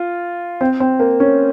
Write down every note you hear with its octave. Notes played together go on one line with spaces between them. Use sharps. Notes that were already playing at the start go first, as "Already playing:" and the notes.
Already playing: F4
C4
C4
A#3
C#4